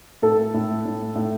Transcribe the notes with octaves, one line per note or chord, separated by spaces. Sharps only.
A2 A4
A2
A2
A2